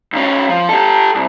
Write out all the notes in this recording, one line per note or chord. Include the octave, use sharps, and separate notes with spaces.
B1 C#4
F3
G4 A4
C2